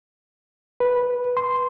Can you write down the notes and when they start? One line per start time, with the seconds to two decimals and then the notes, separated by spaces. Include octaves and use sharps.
0.80 B4
1.37 C6